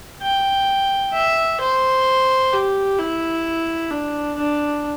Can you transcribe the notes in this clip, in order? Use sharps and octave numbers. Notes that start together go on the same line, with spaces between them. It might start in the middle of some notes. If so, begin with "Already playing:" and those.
G5
E5
C5
G4
E4
D4
D4